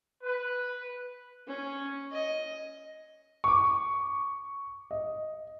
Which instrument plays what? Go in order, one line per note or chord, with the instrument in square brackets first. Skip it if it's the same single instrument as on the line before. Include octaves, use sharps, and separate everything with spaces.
[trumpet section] B4
[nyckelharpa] C#4
D#5
[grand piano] C#6 D6
D#5